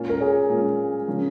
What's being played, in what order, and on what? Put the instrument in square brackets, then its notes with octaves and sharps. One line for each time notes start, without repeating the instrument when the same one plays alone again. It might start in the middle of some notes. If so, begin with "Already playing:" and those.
Already playing: [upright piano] A#2 A#3 C#4 F4
[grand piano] A#4
G#4 C#5
[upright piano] A#2 A#3 C#4 F4
C#3 F3 C#4 G#4